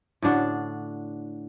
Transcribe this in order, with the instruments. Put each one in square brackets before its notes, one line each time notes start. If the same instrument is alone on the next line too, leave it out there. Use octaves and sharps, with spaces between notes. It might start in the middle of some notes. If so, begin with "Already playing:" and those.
[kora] A2 D3 D4 F#4